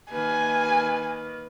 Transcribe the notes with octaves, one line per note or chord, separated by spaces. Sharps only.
D#3 A#3 B4 G#5